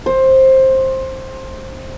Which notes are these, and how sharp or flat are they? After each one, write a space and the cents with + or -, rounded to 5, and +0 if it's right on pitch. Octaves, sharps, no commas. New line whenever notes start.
C5 +15